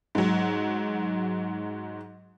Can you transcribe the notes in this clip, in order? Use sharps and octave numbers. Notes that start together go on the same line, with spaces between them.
G#2 F#3